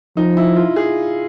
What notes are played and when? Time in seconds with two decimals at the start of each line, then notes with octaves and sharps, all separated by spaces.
0.17 F3 D#4
0.37 E4
0.56 F4
0.76 G#4